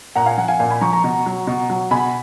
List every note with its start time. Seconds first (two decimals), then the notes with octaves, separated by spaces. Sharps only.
0.15 A#2 F#5 A#5
0.26 F5 G#5
0.38 F3 F#5
0.48 F5 G#5
0.59 A#2 F5 G#5
0.71 G#5 B5
0.81 F3 A#5 C#6
0.92 A#5 C#6
1.04 B2
1.26 F#3
1.47 B2
1.70 F#3
1.91 B2 G#5 B5